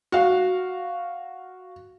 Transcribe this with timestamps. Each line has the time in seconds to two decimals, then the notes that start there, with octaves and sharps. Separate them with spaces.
0.12 F#4 F5